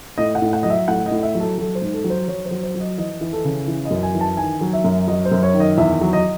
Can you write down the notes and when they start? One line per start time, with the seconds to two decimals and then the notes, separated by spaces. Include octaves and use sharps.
0.18 A2 D#5
0.35 F#5
0.42 A2
0.53 F#5
0.63 F#3 D#5
0.70 E5
0.88 A2 F#5
1.06 D#5
1.11 A2
1.23 E5
1.35 F#3
1.40 A4
1.58 F#3 A4
1.75 C5
1.82 G#2
1.93 A4
2.04 F#3
2.10 C5
2.28 F#3 C#5
2.45 C5
2.51 F#3
2.63 C5
2.75 F#3
2.80 D#5
2.98 E3 D#5
3.21 E3
3.33 A4
3.45 C#3
3.67 E3
3.85 D#5
3.91 F#2
4.03 G#5
4.15 E3
4.21 A5
4.37 D#3 G#5
4.61 F#3
4.73 E5
4.84 F#2
5.08 F#3 D#5
5.25 C5
5.32 F#2
5.43 C#5
5.54 D#3
5.60 D#5
5.78 E2 E5
6.01 F#3
6.13 D#5